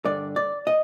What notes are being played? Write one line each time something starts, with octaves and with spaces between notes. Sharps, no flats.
G2 D3 D5
D5
D#5